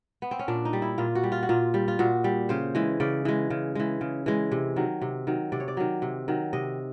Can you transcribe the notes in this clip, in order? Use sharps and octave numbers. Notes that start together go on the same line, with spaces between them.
B3
C4
C#4
A#2 D4
D#4
G3
E4
A#2 F4
F#4
G3
F4
F#4
A#2 F4
G3
F4
A#2 F#4
G3
C#3 C5
E3 G#3
C#3 D5
E3 G#3
C#3
E3 G#3
C#3
E3 G#3
C3
D#3 F#3
C3
D#3 F#3
C3 D5
C#5
D5
D#3 F#3
C3
D#3 F#3
C3 D#5